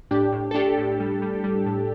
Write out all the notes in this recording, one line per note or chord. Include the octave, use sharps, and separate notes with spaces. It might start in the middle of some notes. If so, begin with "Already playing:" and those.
A2 D4 G4
A2
A4
A2 D4 G4
A2
G3
G3
G3
A2